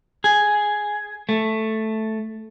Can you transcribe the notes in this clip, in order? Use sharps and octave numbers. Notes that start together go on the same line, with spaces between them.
G#4
A3